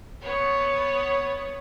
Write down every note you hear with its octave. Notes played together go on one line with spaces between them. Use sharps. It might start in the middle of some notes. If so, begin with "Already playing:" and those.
B3 C#5